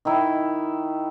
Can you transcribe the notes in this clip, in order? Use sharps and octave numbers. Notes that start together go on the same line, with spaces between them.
D#3 E4